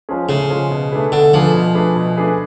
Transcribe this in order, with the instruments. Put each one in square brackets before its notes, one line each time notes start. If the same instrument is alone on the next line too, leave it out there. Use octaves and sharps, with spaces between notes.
[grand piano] F3 G#3 C#4 G#4
[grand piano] A2 [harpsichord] C#3
[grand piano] F3 G#3 C#4 G#4
B2
A3 D4 G#4 B4
[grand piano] B2 [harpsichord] D3
[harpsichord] F3 [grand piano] A3 D4 G#4 B4
[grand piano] B2
A3 D4 G#4 B4
B2
A3 D4 G#4 B4